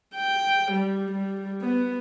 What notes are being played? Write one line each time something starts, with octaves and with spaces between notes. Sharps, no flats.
G5
G3
G3
B3